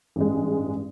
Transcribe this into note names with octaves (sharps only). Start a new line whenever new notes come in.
A1 G2 G#3